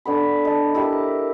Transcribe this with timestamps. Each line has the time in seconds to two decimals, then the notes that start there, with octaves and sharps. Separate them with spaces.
0.05 D3 B3 B5
0.45 D#5 A5
0.74 E4 G4 A#4